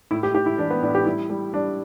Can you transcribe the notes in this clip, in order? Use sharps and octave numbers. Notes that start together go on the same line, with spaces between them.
A2 E4
G4
A2 G4
E4
E3 D4
B3
A2 D4
G4
G3 E4
G3
G3 D4